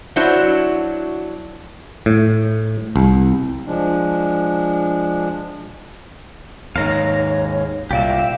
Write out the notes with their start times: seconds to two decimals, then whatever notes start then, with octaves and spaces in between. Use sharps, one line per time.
0.16 F#3 D4 E4 F#4 C5 E5
2.06 A2
2.96 C2
3.66 F3 G#3 D4
6.76 D#2 G#2 C#5 F5 A#5
7.91 C2 A#2 G4 D5 E5 F5